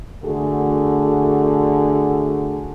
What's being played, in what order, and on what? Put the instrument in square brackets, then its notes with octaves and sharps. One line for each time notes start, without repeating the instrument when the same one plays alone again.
[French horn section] D3 A3 F#4 G#4